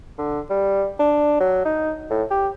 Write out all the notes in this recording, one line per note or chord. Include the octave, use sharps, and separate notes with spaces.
D3
G3
D4
F#3
D#4
A2
G4